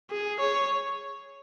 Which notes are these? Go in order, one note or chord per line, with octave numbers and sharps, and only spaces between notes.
G#4
C#5